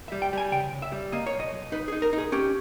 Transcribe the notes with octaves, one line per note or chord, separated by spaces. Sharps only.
E5
G3
G5
G3 G#5
C#3 G5
C#3
E5
G3
A#3 D#5
C#5
B1
D#5
B1
D#4 B4
G#4
D#4
A#4
D#4
G#4
C#4 G4